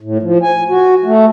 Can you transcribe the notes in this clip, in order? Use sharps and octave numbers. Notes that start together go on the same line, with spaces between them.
A2
F3
G#5
F#4
A3